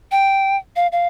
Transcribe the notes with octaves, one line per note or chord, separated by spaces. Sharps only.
G5
F5
F5